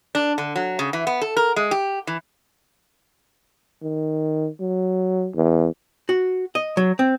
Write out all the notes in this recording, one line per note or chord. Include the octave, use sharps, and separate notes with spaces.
D4
D3
F#3
C#3
E3
B3
A4
A#4
G#3
G4
E3
D#3
F#3
E2
F#4
D#5
F#3
C4